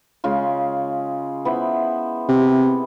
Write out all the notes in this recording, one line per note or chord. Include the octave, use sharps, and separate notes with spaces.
C#3 G#3 F4
B3 E4 C5
C3